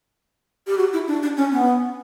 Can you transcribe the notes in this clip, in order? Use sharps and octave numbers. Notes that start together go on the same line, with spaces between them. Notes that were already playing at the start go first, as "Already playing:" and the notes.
G4
F#4
E4
D4
D4
C#4
B3